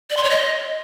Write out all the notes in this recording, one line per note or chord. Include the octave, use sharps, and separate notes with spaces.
D5
C6
C#5
D#5